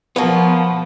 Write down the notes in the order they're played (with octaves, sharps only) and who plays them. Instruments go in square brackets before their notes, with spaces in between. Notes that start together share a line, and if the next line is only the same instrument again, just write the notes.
[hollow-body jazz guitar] B2 A#3 B3 [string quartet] F3